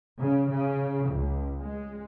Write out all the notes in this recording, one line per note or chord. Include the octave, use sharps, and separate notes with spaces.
C#3
C#3
C#2
G#3